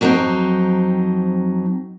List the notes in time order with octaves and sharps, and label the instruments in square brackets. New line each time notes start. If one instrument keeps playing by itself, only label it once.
[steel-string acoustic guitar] F2 F#3 B3 C4 D#4